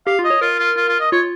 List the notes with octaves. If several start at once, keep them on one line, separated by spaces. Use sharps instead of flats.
G4 F5
F4
D#5
C#5
F4 A#4
F4
F4
F4
D#5
F4 C#5